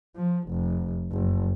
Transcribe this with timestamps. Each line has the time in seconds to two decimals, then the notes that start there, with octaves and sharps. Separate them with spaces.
0.17 F3
0.49 F1
1.12 F#1